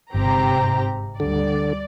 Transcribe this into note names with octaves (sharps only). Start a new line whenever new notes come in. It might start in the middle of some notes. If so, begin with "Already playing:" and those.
G1 G#2 C3 C4 G4 A#5
D2 D3 G3 D5